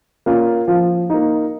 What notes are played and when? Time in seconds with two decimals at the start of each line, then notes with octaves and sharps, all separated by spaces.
0.26 A#3 C#4 F4
0.68 F3
1.10 A#3 D#4